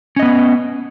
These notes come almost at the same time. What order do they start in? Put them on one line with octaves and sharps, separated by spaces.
C#4 D#5 B3